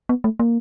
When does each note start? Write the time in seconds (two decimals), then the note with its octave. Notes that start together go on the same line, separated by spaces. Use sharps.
0.09 B3
0.24 A3
0.39 A#3